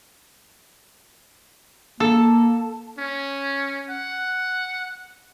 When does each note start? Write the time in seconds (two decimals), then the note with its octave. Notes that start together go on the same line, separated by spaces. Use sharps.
2.00 A#3 A4
2.98 C#4
3.90 F#5